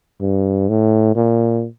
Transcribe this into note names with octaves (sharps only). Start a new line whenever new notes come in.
G2
A2
A#2